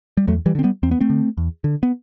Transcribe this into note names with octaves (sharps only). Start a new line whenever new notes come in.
G3
E2 F#3 A3
E3 G3
D3 C4
G3 B3
E2 C4
B3
A3 C4
D3
E2
D3
B3